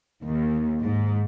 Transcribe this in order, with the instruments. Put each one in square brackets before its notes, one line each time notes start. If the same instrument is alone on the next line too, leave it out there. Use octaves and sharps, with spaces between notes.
[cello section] D#2
G#2